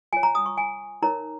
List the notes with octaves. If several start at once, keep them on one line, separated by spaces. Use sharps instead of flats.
F4 C#5 G#5
A#5
D#6
C#6
G#5
D#4 A#4 C#5 A#5